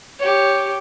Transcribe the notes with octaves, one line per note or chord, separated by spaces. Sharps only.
G4 C#5